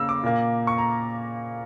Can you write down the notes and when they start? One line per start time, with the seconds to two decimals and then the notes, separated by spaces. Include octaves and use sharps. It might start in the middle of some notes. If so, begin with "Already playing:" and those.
Already playing: C#3 A#3 E6
0.09 D6
0.23 A#2 A#3
0.67 C#6
0.78 A#5